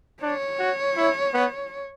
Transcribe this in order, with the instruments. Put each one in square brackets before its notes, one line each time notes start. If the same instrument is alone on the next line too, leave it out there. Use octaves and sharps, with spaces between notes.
[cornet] D4 [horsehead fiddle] C#5
[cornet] F#4
E4
B3